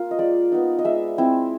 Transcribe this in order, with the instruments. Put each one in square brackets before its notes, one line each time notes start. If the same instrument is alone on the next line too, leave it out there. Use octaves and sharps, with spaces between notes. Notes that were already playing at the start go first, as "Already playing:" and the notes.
Already playing: [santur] A#3 F4
D#5
G#3 D5
B3 D#4
D#5
G#3 E5
C4 E4